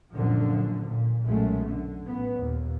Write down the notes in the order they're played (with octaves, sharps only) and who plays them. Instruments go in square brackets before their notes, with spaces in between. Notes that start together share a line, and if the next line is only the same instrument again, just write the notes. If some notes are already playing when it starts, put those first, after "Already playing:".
[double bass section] C2 F#2 A#2 D3 F3
A#2
B1 F#2 G#3 A3
D3
A1 B3
D#2 A#2